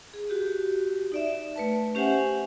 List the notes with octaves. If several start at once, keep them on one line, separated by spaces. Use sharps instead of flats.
G#4
F#4 G4
D#4 D5 E5
A3 B4 A5
C#4 G4 C5 E5 F#5 G#5